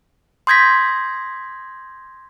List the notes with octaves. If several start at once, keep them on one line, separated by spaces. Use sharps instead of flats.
C6 D#6 G6 G#6 A#6 B6